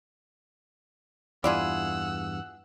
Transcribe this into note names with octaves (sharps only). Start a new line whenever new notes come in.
E2 G2 E4 F4 G#4 D5 F#5 E6